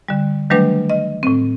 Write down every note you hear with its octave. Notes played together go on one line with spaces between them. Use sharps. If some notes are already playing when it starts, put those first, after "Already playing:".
D3 G3
D#3 F#3 G3 A3 D4 B4
D#5
A2 C4